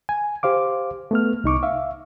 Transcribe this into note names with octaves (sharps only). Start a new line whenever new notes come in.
G#5
G4 C5 F5 D6
A3 B3 F6
C2 D#4 C#6 D6
E5 F5